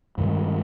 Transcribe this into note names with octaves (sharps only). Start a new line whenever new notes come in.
G2 D#3 G#3